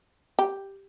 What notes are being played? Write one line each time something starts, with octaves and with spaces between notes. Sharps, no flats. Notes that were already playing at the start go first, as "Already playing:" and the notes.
G4